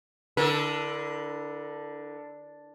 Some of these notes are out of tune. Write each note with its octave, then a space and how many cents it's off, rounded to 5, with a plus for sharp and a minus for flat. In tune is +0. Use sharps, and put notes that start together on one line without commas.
D3 +0 E4 -20 A#4 +35